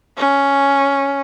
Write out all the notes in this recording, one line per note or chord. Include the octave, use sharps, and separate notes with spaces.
C#4